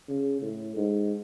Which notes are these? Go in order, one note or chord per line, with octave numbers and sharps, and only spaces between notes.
C#3
A2
G#2